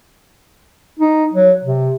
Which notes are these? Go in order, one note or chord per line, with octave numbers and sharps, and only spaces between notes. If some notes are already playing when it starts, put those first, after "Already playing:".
D#4
F#3
C3